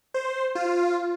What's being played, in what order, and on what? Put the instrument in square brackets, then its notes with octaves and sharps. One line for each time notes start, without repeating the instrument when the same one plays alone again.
[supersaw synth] C5
F4